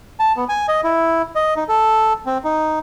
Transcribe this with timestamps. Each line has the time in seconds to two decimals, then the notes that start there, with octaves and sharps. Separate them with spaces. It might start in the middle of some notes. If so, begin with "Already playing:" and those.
0.20 A5
0.37 B3
0.49 G#5
0.68 D#5
0.84 E4
1.35 D#5
1.57 D#4
1.69 A4
2.26 C4
2.44 D#4